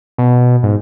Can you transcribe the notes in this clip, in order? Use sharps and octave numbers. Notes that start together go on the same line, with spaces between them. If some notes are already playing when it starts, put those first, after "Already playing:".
B2
G#2